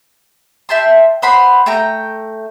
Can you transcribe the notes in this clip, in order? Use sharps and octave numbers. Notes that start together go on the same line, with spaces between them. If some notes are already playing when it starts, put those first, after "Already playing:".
E5 G5 A5 C6
C5 F#5 B5 C6
A3 G5 A#5